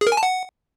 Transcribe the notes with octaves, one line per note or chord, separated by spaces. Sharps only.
G#4
A#4
G#5
A5
F#5